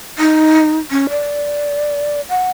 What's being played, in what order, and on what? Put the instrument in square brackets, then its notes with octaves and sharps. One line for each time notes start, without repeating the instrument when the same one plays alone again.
[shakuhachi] D#4
C#4
D5
F#5